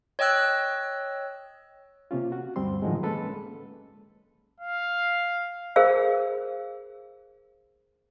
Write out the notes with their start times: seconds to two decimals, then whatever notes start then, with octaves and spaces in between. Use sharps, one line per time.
0.19 C#5 D#5 G5 E6 F#6
2.11 C3 A#3 C#4 F4
2.32 F#4
2.56 D2 G2 G3 C4 C6
2.82 A2 D3 D#3 F3 F#3 G#3
3.03 G#3 A#3 C#4 A4 B4
4.60 F5
5.76 G#4 A#4 C5 F5 E6